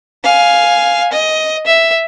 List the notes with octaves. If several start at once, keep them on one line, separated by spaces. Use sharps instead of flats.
F5 G#5
D#5
E5